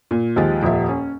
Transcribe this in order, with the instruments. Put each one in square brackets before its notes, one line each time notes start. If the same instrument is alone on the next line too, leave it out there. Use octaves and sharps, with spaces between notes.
[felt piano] A#2
D#2 F3 G#3 G4 G#4 A6
D#1 F2 F3 G4 E5
C#4